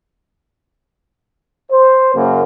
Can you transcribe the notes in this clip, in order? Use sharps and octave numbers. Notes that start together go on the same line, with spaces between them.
C5
F#2 C#3 A#3